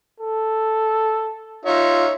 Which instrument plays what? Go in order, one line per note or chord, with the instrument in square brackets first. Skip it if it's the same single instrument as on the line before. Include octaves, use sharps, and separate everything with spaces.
[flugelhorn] A4
[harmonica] D#4 C#5 E5 [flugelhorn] F4